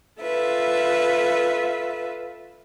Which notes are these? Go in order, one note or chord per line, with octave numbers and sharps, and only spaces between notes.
F4 A4 B4 E5